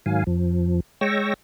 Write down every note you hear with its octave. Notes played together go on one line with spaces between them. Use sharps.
G#2 D#3 F#3 F5 G#5
F2 F3
G#3 C#5 G5 C#6 E6 A#6